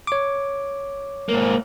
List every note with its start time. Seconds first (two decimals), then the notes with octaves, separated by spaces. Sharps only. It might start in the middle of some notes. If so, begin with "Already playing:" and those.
0.07 C#5 D6
1.29 G#2 A#3